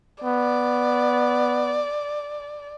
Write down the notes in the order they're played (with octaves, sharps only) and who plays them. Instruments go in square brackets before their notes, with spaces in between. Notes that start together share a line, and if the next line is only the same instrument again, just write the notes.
[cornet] B3 [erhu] D5